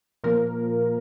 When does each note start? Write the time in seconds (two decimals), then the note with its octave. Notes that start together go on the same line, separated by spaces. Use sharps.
0.24 A#2 F3 A#3 A#4